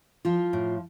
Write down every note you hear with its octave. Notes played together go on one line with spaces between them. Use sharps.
F3 F4
A2